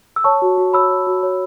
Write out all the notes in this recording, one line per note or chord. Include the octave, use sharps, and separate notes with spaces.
E6
C#5 A5 C#6
F#4
F#4
C#5 B5 E6
C#5
F#4
C#5